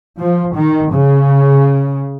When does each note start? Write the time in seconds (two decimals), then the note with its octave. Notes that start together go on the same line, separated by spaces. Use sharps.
0.17 F3
0.54 D#3
0.92 C#3